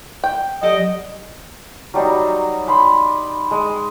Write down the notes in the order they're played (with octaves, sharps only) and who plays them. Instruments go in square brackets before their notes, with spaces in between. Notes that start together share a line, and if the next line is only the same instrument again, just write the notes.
[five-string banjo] G5
[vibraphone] F#3 G4 D5 [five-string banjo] A4 [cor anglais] D#5
[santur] F#3 G3 D#4
G5 B5 C6
G#3